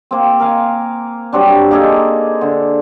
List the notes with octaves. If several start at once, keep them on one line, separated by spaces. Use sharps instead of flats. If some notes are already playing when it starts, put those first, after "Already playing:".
A#3 C4
A#4 F5 G#5
F#3 G3 C4 D4
A#3 D#4 G#4 A4
D3